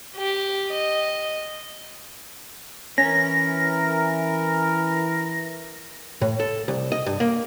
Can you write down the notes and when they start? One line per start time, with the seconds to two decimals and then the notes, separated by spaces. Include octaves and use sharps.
0.16 G4
0.71 D#5
2.98 E3 C#4 A#4 A#6
6.22 A2
6.40 A4
6.68 C2
6.92 D#5
7.06 G2
7.20 A#3